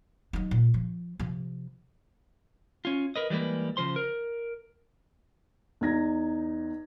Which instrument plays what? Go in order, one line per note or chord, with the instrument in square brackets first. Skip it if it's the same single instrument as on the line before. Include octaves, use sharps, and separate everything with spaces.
[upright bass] F#3 D#4
A#2
F3
C3 F3
[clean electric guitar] C#4 F4
A#4 B4 D#5
E3 G3 G#3 A#3 B4
C#3 F3 C5 C6
A#4
[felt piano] E2 D#4 G#6 A#6